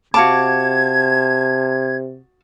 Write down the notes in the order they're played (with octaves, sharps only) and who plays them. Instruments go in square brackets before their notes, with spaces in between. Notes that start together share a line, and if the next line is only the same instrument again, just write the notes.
[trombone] C3 [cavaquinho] F#4 F5 D6 [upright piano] A5 [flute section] G#6